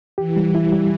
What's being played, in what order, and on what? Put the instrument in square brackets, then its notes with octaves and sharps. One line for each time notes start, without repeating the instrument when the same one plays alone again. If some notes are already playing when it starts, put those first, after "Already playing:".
[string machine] E3 [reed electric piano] G4
[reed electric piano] G3
[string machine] E3 [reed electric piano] E4
[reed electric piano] G3